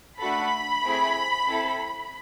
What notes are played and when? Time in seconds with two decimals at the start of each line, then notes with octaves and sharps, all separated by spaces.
0.19 A3 D4 F#4 A4 B5
0.84 A3 C4 E4 G#4
1.46 C4 E4 A4